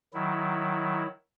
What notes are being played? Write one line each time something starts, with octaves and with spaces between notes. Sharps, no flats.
D#3 F#3 E4